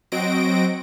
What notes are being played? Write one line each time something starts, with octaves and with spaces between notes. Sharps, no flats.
F#3 C4 F#4 D#5 A#6 D7